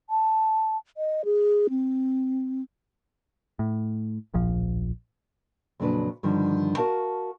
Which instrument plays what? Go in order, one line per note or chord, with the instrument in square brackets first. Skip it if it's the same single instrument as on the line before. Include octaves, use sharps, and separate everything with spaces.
[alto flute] A5
D#5
G#4
C4
[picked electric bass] A2
D1 A#1 F3
[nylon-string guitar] F2 A#2 C#3 F#3 D4 B4
G2 D3 D#3 F3 G3
F#4 A#4 F5 A5